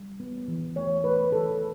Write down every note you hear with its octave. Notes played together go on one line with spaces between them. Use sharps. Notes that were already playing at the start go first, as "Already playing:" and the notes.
Already playing: G3
B3
E3
A3 C#5
A3 B4
E3 A4